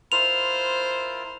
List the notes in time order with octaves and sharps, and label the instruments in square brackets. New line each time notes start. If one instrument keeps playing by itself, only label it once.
[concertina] E4 F4 A#4 [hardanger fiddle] C5 [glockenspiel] F7